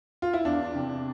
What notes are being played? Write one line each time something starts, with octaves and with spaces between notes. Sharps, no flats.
F4
E4
E2 D4
C3